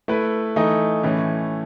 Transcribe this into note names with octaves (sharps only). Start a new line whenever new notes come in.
A3 E4 B4
E3 A3 D#4
A2 E3 A3 C#4